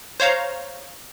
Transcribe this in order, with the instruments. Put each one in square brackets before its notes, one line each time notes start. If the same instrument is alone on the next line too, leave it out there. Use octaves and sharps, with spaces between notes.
[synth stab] C5 C#5 F5 A#5